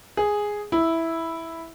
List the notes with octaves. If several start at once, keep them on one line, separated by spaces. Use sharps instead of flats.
G#4
E4